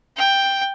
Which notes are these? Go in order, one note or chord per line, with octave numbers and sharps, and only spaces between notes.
G5